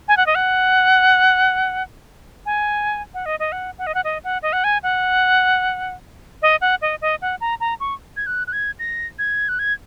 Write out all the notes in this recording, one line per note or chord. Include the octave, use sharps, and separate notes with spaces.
G#5
F#5
D#5
F#5
G#5
F#5
D#5
D#5
F#5
F#5
D#5
F#5
D#5
F#5
D#5
F#5
G#5
F#5
D#5
F#5
D#5
D#5
F#5
A#5
A#5
C#6
G#6
F#6
F#6
G#6
A#6
G#6
F#6
G#6